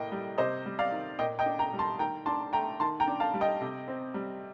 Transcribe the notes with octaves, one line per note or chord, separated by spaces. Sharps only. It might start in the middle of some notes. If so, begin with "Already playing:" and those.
Already playing: A2 A#3 D#5 G5
G3
C3 C5 D#5
G3
D5 F5
D#3
A#2 D#5 G5
D#5 G5
D4
G5 A#5
G3
A5 C6
D#3 G5 A#5
D4 A5 C6
A3 G5 A#5
D#3 A5 C6
G5 A#5
D4
F5 A5
G3
D#5 G5
C3
C4
G3